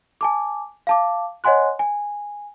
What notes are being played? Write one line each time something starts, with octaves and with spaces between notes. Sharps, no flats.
G#5 A5 D6
F5 A5 D6
C#5 D#5 F#5 G#5 C6 F#6
G#5